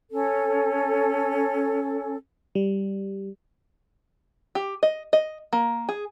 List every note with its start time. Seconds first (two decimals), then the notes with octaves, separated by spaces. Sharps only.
0.11 C#4 A4
2.55 G3
4.55 G4
4.83 D#5
5.13 D#5
5.53 A#3
5.89 G#4